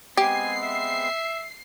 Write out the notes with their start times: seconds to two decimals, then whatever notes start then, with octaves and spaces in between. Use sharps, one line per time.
0.17 G#3 B3 C4 G4 G#5 C7
0.63 E5